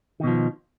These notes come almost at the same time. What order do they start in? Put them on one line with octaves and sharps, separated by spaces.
D#3 B2 F3